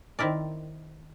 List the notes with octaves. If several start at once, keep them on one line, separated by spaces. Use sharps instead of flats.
D#3 C4 E4 A#4 D5